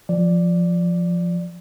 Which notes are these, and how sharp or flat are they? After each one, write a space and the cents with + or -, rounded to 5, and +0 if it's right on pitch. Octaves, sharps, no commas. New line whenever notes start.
F3 +0 D5 +0